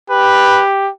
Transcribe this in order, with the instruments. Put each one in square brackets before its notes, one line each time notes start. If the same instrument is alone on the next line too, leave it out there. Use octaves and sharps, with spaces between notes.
[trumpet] G4 [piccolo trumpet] B4